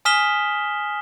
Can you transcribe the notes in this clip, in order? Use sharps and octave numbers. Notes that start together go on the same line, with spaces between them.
G#5 D#6 F6 B6 E7 G7